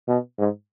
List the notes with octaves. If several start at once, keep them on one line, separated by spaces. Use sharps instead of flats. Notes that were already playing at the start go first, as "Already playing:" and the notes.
B2
G#2